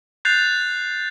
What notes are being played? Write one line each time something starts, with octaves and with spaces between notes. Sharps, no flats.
F#6 G6 A6 C7 F7